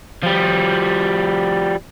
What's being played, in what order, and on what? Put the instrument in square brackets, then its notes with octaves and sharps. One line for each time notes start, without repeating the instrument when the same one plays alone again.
[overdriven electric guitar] F3 G3